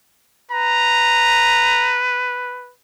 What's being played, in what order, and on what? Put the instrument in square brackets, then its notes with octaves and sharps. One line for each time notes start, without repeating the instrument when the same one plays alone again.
[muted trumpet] B4 [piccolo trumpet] A#5